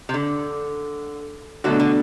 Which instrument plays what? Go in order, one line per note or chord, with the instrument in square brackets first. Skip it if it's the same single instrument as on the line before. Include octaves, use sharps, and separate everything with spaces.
[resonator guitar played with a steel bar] C3
D3
[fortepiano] B2 A3 D4 F#4 [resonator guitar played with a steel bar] D3 F#3
[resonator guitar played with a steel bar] D3